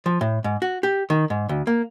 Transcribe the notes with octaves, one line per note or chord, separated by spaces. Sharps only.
F3
A2
G#2
F#4
G4
D#3
G#2
D2
A#3